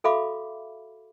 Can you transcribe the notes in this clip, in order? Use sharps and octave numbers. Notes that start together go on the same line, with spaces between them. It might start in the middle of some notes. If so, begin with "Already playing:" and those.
F#4 A4 E5 F5 B5 D6